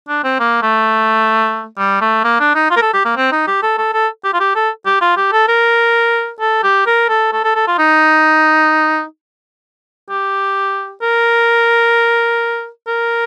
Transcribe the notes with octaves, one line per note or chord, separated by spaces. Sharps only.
D4
C4
A#3
A3
G3
A3
A#3
D4
D#4
F4
A#4
A4
G4
A#3
C4
D#4
G4
A4
A4
A4
G4
F4
G4
A4
G4
F4
G4
A4
A#4
A4
G4
A#4
A4
A4
A4
A4
F4
D#4
G4
A#4
A#4